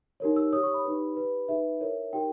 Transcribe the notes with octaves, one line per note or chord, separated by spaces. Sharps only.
D#4 G4 A#4 C#5
E6
G4 C#5 D#6
C#6
B5
D#4 G4 B4
G4 B4
D#4 G#4 B4 E5
E4 A#4 C#5
D#4 G4 A#4 G5